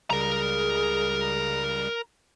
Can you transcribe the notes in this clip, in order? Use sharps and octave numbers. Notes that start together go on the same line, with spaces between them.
C#2 C#3 G3 G#4 A#4 A#5